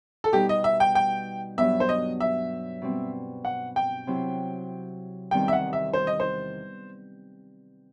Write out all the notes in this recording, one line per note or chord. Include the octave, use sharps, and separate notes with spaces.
A4
B2 G3 B3 D#4 G4
D#5
E5
G5
G5
G2 F#3 B3 E5
C5
D#5
E5
B2 G3 C4
F#5
G5
C3 F#3 C4 E4
E2 D#3 G3 C4 G5
E5
F#5
E5
C5
D#5
C5